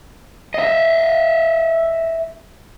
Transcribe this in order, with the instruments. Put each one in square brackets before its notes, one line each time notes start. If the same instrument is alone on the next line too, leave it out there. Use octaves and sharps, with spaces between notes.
[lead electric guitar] D#5 E5